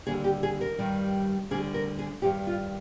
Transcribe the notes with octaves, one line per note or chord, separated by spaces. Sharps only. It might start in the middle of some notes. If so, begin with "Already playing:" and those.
D#2 D3 G3 G#4
G4
G#4
A#4
G2 D#3 G3
D2 D3 G3 G#4
A#4
G#4
G2 D#3 G3 G4
F4